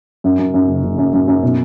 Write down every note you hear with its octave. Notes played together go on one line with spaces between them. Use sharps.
F#2
F#2
F#2
F#1
F#1
F#2
F#2
F#2
B2